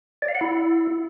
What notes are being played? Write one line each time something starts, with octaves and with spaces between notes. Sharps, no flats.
D5
F5
F#5
E4